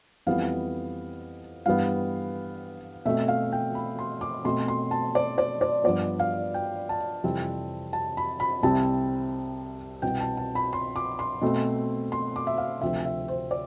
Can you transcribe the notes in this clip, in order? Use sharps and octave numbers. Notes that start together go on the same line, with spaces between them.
F2 E3 G3 B3 F5
G2 E3 G3 B3 F5
B2 A3 C4 E5
F5
G5
B5
C6
D6
B2 A3 C4 C6
C6
A5
D5
D5
D5
G2 F3 B3 D5
F5
G5
A5
F2 C3 E3 G3 C4
A5
B5
B5
C2 C3 G3 C4 A5
C2 B2 B3 G5
A5
A5
B5
C6
D6
C6
B2 A3 C4
C6
D6
E5
F5
D2 C3 F3 C4 E5
E5
C5
D5